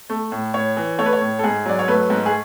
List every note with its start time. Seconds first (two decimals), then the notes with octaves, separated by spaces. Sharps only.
0.10 A3
0.32 A2
0.54 A2 C#5
0.77 E3
0.98 A3 C#5
1.06 B4
1.13 C#5
1.21 A2
1.39 A4
1.44 G#2 G#4
1.66 F#3 D5
1.79 C#5
1.88 A3 B4
2.10 G#2
2.26 G#4